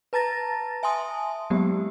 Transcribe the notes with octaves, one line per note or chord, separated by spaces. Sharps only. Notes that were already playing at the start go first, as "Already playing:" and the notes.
B4 A5 A#5 A6 A#6
E5 G#5 A5 C6 D#6
F#3 G#3 A#3 B3 G4